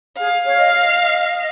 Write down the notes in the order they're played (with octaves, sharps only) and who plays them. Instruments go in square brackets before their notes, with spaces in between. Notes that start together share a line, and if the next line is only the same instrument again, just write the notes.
[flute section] G#4 [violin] F5
[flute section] C#5
D#5
D#5